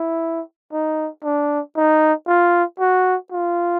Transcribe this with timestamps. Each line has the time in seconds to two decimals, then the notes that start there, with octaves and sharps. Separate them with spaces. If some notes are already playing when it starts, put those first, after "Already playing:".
Already playing: E4
0.73 D#4
1.24 D4
1.77 D#4
2.27 F4
2.80 F#4
3.32 F4